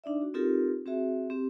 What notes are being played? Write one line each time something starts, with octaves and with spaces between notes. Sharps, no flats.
D4 D#4 D5 E5
F#4
C4 D#4 F4 G4 A4 A#4
C4 F#4 G#4 E5
C4 G4